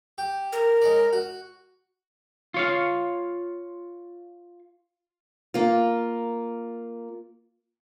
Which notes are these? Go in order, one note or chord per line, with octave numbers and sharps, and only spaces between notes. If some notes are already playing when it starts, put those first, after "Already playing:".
G4
A#4
G#3 C#5 D5
F#4
F4 C#5 F5
A#3 F4